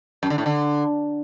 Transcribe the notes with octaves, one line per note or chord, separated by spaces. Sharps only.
F#2
D3
A2
D3